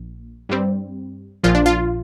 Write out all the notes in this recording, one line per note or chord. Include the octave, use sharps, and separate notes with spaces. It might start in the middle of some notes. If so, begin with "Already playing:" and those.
Already playing: A#1 A#2
G2 G3 C4
A#1 A#2 F3 F4
D4
F4